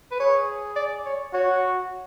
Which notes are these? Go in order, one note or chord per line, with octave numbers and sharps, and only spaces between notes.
B4
G#4 C#5
D5
C#5
F#4 C#5